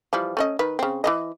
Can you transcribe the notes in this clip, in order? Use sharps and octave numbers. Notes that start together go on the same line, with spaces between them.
E3 F3 G3
A3 C#4 D#5
D#3 B4
C#3 C4
E3 B3 D#5